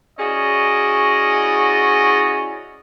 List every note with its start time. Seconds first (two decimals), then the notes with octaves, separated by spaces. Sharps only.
0.19 C#4 E4 F#4 G#4 D5 D#5